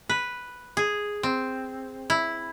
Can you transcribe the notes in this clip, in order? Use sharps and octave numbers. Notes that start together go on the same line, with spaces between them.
B4
G#4
C4
E4